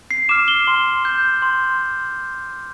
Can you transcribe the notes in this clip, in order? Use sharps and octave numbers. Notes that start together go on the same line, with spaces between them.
C7
D6 F6 E7
G7
C6
G6
C6